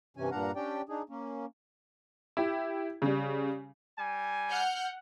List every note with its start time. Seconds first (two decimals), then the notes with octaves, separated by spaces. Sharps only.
0.17 G2 C3 E3 C#4 G#5
0.31 G2 A#2 D4 F5 F#5 A#5
0.56 C#4 D4 G4 D5 G5
0.89 D4 D#4 G#4
1.10 A#3 C#4
2.37 E4 G4
3.02 C#3 G3
3.98 G3 G#5
4.50 F#5 F6 G6